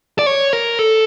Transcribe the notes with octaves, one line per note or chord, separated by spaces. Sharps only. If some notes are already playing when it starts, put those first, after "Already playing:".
D5
C#5
A#4
A4